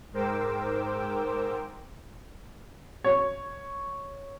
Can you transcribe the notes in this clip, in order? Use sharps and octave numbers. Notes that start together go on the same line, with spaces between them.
G#2 A#4 C5 G5 D6 E6
C#5